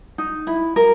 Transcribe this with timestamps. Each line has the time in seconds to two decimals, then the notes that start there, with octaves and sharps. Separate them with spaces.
0.18 D#4
0.47 E4
0.76 A#4